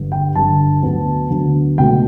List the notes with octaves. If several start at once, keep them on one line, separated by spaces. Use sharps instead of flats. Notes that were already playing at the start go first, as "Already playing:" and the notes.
Already playing: G1 G2 D3
G5
G1 G2 D3 A5
D2 D3 F#3 B3
D2 D3 F#3 B3
C#2 B2 F#3 A3 G5